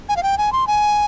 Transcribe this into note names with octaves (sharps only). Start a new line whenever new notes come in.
G#5
F5
G5
G#5
C6
G#5